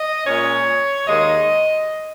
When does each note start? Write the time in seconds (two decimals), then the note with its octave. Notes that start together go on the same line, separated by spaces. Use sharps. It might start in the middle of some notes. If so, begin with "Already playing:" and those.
Already playing: D#5
0.26 A#2 G#3 C#4 C#5
1.07 D#2 D#3 G#3 D#5